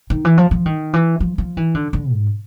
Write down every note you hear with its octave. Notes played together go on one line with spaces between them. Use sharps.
D#3
E3
F3
F3
D#3
E3
F3
F3
E3
D3
D3
G#2